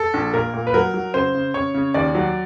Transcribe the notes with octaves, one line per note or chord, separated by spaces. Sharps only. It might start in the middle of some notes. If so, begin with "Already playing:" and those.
Already playing: A4
A#1
A#2 A#4
A#2
B4
F#3 A#4
F#3
C#3 C5
C#3
C#3 C#5
C#3
D#2 D5
F#3